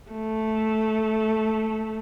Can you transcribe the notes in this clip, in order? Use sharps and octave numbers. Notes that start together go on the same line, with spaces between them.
A3